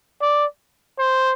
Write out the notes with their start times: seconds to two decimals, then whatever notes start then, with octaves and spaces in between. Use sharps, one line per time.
0.22 D5
0.99 C5